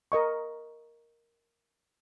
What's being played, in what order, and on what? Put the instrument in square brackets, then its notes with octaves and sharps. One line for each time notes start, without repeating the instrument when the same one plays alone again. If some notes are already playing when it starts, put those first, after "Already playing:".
[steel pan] A#4 D#5 C#6